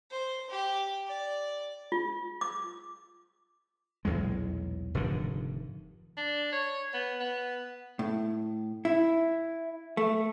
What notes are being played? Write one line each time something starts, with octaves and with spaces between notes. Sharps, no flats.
C5
G4
D5
F4
D6
B1 E2 A#2 G#3
F1 G#2 D3 D#3
D4
C#5
B3
B3
A2
E4
A3